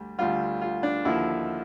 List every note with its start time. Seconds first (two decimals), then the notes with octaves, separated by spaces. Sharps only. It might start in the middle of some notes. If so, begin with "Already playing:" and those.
Already playing: D2 G3
0.19 D2 D3 G3 F4
0.61 F4
0.83 D4
1.05 D#2 D3 F3 E4